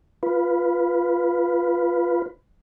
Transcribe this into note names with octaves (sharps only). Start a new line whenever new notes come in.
F4 B4